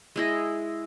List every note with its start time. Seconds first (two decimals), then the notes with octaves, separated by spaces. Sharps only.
0.16 G#3 E4 D#5